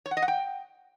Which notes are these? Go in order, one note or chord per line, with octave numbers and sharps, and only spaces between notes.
C#5
F#5
D#5
F#5
G5